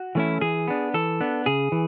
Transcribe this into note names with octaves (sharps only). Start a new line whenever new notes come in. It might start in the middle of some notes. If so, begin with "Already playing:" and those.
Already playing: F#4
E3 A3 C#4 E4
E3 G#4
B3 D4
E3 A4
B3 D4
C#3 G#4
E3